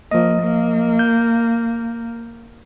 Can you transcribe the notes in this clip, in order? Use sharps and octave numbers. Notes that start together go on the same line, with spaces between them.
F3 A#3 D#5
A#3
G6